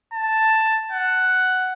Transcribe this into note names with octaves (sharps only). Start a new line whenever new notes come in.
A5
F#5